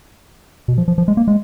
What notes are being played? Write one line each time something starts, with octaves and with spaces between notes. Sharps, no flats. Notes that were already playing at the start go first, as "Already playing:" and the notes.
B2
F3
F3
F3
G#3
A#3
G#3